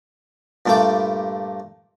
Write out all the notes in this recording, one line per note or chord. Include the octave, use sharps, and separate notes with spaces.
G2 A#2 G3 A3 G5 D6